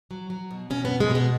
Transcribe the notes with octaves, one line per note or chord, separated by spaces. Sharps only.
F#3
F#3
B2
B2 C#4
B3
B2
G#3
B2
B3